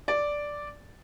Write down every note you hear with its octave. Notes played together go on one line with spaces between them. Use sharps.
D5